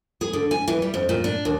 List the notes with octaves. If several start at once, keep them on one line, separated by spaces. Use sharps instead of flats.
G#4
D3
G#5
E3
G3
F2
A#2
D4
D#2